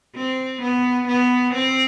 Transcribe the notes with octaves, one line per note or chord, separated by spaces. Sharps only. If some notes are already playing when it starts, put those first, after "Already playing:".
C4
B3
B3
C4